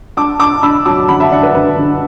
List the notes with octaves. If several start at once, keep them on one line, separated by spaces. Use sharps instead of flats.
D4 A5 D6
D4 A5 D6
D4 B5 E6
F#3 A5 D6
D3 F#5 B5
E5 A5
D3 D5 F#5
B4
D3 B4
D3